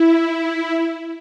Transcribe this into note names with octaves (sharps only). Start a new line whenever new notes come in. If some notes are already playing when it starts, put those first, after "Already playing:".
Already playing: E4